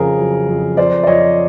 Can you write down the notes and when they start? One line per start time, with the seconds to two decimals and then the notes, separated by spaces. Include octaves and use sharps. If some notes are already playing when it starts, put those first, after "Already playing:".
Already playing: F2 C#3 G#4 A#4
0.18 F#3
0.48 F2
0.77 F2 C5 D5
1.03 D5
1.07 F2 C#5 D#5